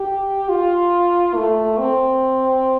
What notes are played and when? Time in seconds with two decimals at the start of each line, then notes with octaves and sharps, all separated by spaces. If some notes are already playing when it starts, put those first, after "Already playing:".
Already playing: G4
0.49 F4
1.35 A3
1.78 C4